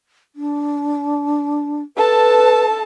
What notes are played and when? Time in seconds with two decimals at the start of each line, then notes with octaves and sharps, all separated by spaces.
0.35 D4
1.97 A4 B4 A5